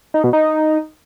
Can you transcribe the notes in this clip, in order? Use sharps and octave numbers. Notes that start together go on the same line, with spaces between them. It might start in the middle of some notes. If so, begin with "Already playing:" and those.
D#4
B2
D#4